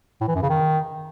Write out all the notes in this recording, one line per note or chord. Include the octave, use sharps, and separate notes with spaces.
A2
E3
F#2
C#3
D#3